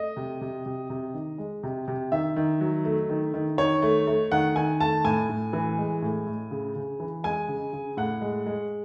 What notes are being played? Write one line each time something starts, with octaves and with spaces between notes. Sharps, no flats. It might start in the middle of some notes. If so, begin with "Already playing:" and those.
Already playing: A3 D#5
C3
C3
C3
C3
D#3
G#3
C3
C3
D#3 E5
D#3
F#3
A3
D#3
D#3
D#3 C#5
A3
A3
D#3 F#5
D#3 G#5
A3 A5
A2 G#5
A2
E3
G#3
A2
A2
C#3
C#3
E3
G#3 G#5
C#3
C#3
A2 F#5
G#3
G#3